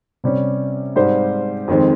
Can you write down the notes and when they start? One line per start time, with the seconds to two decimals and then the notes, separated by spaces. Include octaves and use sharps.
0.24 C3 G3 C#4
0.96 G#2 G3 C4 G4 C5
1.68 F2 D#3 G#3 C4